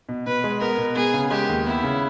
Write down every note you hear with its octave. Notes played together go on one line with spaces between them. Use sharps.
B2
B2 B4
G#3
B3 A#4
B2
B3 G#4
C#3
G#3 G4
D#2
B3 E4
C#3